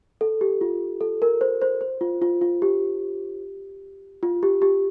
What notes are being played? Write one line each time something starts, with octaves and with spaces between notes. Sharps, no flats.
A4
G4
F4
A4
A#4
C5
C5
C5
F4
F4
F4
G4
F4
G4
G4